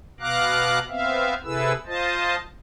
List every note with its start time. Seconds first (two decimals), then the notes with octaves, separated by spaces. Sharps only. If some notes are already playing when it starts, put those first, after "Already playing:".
0.20 B2 B3 F5 A#5 D6 F#6
0.88 B3 C4 E5 F5
1.44 C3 E4 G#4 A4 B4 E6
1.86 F4 C5 D#5 A5